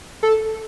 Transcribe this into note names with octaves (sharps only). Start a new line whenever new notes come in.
A4